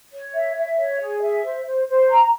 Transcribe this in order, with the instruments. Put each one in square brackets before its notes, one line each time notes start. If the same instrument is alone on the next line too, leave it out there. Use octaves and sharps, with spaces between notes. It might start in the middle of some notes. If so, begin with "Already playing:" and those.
[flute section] C#5
E5
E5
C#5
G#4
E5
C5
C5
C5
A#5